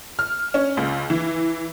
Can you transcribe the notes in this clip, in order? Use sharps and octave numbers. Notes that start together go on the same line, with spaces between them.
F6
C#4
C#2
E3